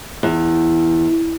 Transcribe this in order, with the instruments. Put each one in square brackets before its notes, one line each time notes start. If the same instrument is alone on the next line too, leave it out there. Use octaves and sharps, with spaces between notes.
[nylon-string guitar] E2